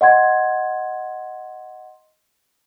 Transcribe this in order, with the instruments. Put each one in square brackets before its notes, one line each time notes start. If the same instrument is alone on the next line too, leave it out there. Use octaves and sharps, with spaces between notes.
[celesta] D#5 F#5 C6 G#6